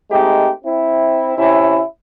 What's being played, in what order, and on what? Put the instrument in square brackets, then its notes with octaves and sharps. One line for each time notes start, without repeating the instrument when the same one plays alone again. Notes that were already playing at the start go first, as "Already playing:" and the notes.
[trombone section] G#3 A3 C4 D#4 G4
C4 E4
C3 C#4 E4